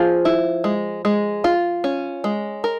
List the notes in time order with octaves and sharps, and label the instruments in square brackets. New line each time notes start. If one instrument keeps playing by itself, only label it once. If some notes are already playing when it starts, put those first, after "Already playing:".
Already playing: [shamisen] F3 [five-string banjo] G#4
[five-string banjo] E4
G#3
G#3
F4
C#4
G#3
A#4